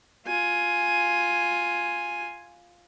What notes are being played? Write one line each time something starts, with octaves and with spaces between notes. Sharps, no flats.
F4 G#5